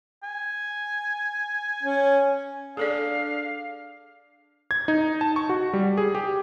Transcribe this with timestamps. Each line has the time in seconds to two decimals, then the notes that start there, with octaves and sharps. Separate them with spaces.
0.23 G#5
1.83 C#4
2.77 D4 G#4 A4 D5 F5
4.71 G#6
4.88 D#4
5.21 A5
5.36 C#6
5.49 F#4
5.73 G3
5.97 G#4
6.15 G4